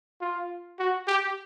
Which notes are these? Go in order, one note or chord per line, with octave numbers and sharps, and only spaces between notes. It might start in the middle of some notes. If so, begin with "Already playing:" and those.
F4
F#4
G4